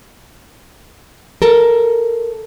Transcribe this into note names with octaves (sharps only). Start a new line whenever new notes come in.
A4 A#4